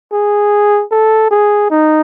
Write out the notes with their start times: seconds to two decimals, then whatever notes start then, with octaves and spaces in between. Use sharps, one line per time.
0.13 G#4
0.91 A4
1.31 G#4
1.71 D#4